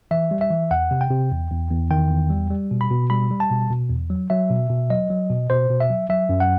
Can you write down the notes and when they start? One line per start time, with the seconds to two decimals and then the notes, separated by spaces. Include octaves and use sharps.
0.11 E3 E5
0.31 G3
0.41 E5
0.50 E3
0.71 E2 F#5
0.91 C3
1.01 G5
1.10 C3
1.31 E2
1.50 E2
1.71 E2
1.91 D#3 G5
2.11 E2
2.30 G3
2.50 G3
2.71 B2
2.81 B5
2.91 B2
3.10 G3 B5
3.30 G3
3.40 A5
3.51 B2
3.71 B2
3.90 E2
4.10 F#3
4.30 F#3 E5
4.50 B2
4.70 B2
4.90 F#3 D#5
5.10 F#3
5.30 B2
5.50 B2 C5
5.69 B2
5.80 E5
5.90 F#3
6.09 F#3 E5
6.29 F#2
6.40 F#5